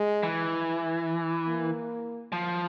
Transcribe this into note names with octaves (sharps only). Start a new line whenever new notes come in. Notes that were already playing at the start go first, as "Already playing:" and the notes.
Already playing: G#3
E3
A#3
F3